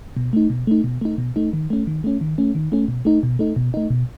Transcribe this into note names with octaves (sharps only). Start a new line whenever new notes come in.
B2
A3 D#4
B2
A3 D#4
B2
A3 D#4
B2
A3 D#4
D#3
A3 C#4
D#3
A3 C#4
D#3
A3 C#4
D#3
A3 C#4
B2
A3 D#4
B2
A3 D#4
B2
A3 D#4
B2